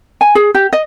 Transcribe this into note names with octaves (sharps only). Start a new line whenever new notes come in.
G#5
G#4
G4
D#5